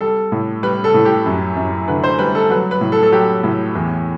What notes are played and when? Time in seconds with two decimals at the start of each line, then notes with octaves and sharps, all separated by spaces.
0.01 G3 A4
0.32 A2
0.63 G3 B4
0.84 A4
0.94 A2
1.05 G4
1.26 F#2
1.56 F#2
1.88 D3 B4
2.04 C5
2.19 G3 B4
2.35 A4
2.50 F#3 B4
2.71 B4
2.81 A2
2.92 A4
3.03 A4
3.12 F#3 G4
3.44 A2
3.75 E2